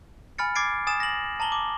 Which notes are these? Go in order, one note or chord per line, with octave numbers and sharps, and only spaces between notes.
G#5 B5 F6 A6 C#7
D6 G#6 A6 C7 D7
G#5 D#6 A6 E7
A#6 F#7
A5 A#5 F#7 G7
D6